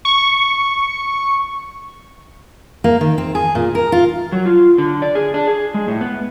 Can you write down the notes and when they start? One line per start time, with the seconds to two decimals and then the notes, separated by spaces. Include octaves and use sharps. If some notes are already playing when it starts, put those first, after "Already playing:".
0.05 C#6
2.84 A#3
3.01 D#3
3.18 C4
3.35 G#4
3.55 A#2
3.75 A#4
3.92 F4
4.32 F#3
4.46 F4
4.78 D3
5.02 D5
5.15 G#4
5.34 D4
5.47 G#4
5.74 G#3
5.88 A2
6.01 B3